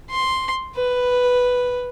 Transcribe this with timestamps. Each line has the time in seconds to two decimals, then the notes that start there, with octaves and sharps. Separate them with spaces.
0.10 C6
0.76 B4